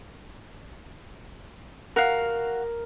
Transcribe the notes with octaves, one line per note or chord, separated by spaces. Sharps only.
F#4 A#4 F5